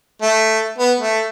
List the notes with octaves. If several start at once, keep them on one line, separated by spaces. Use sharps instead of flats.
A3
B3
A3